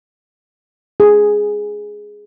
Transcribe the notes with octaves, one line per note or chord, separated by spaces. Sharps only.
G#4